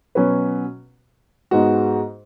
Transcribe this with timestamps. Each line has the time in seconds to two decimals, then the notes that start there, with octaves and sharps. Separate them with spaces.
0.15 B2 F#3 C#4 F#4 B4
1.51 G#2 G#3 B3 F#4